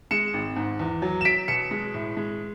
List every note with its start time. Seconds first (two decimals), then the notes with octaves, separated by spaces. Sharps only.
0.11 G#3 C#7 E7
0.33 G#1
0.56 G#2
0.79 E2
1.02 F#3
1.21 E7
1.25 F#3 B6 D7
1.48 B2 C#7 E7
1.71 G#3
1.94 A2
2.17 G#3